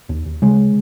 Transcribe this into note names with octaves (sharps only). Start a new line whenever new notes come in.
D#2
D#2
C#3 G#3